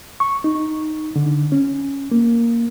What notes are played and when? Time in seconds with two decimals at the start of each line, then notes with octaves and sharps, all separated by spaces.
0.20 C#6
0.44 D#4
1.16 D3
1.52 C#4
2.12 A#3